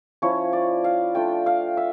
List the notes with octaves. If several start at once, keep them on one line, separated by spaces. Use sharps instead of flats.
F3 C#4 E4 C#5
D5
F5
A3 D4 F4 G5
F5
E5